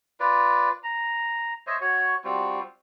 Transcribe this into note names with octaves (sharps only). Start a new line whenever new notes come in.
F4 B4 D5
A#5
C5 C#5 D#5 E5
F#4 C#5
G3 C4 F4 F#4